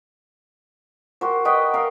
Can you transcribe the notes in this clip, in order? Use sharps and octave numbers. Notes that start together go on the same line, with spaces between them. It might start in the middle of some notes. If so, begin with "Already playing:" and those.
F#4 G4 A#4 C5
F#4 B4 D#5 G5
A#4 F5